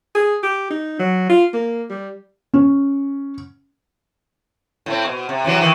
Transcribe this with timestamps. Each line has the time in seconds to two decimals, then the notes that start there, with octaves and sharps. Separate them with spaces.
0.15 G#4
0.43 G4
0.70 D#4
0.99 F#3
1.29 F4
1.53 A#3
1.90 G3
2.54 C#4
4.86 A2 C4
5.05 B2
5.29 C3
5.45 C3 E3 F#3
5.61 D#3 E3